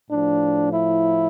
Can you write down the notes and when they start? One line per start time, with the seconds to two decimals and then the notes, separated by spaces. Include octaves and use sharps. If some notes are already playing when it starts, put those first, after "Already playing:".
0.10 A2 F3 D4
0.73 E4